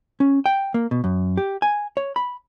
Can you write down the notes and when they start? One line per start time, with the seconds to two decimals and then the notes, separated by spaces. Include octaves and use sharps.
0.20 C#4
0.46 G5
0.74 A#3
0.91 B2
1.04 F#2
1.37 G4
1.62 G#5
1.97 C#5
2.16 B5